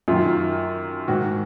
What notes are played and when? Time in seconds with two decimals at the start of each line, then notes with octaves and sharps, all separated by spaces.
0.08 F#2 D#3 F4
1.08 G#2 D#3 F#4